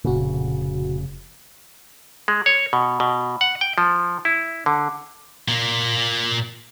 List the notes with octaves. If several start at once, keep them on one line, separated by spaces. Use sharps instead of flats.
F1 A#2 C#3 F#4
G#3
C#5
B2
B2
F#5
G5
F3
E4
D3
A#2 A#3